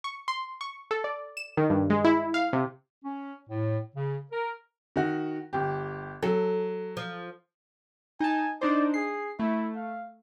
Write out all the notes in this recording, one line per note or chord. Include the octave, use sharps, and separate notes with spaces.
C#6
C6
C#6
A4
D5
E7
D#3
G2
G#3
E4
F5
C3
C#4
A2
C#3
A#4
D#3 F#4
G1 G4
F#3 A4
F3
D#4 G#5 A5
D4 D#4 C5 D5
G#4 C7
A3 E4
F5